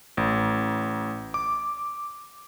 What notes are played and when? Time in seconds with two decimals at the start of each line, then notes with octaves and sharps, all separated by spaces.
0.17 A1
1.34 D6